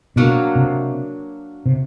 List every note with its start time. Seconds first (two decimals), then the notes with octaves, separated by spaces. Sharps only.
0.16 B2 F#3 A#3 D4
0.55 C3
1.66 C3